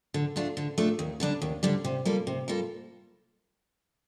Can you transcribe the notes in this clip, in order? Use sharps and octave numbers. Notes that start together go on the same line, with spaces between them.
D3
A3 D4 F4
D3
A3 D4 F4
D#2
D3 G3 D4
D#2
D3 G3 D4
C3
G3 A#3 F4 A4
C3
G3 A#3 F4 A4